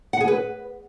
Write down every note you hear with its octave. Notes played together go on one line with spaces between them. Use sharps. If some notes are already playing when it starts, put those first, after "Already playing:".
F#5
G#4
B4